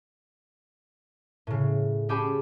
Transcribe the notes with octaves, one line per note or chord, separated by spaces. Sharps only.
A2 C#3
C#4 G4 G#4 G5 A5 B5